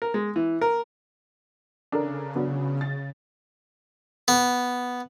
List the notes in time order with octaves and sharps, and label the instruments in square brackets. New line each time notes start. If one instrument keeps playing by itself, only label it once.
[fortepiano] A#4
G#3
E3
A#4
[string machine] C#3 [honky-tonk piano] D4 A4 A#4
[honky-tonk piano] F#3 B3 D4
A6
[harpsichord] B3